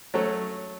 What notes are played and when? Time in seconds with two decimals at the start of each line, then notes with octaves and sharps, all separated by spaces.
0.14 F#3 A3 C#4